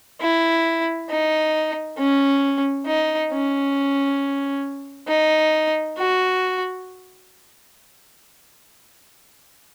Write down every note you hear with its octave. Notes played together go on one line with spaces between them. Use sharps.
E4
D#4
C#4
D#4
C#4
D#4
F#4